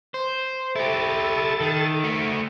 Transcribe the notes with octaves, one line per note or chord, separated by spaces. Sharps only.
C5
E4 G4 A4 A6
D#3
A3 F#4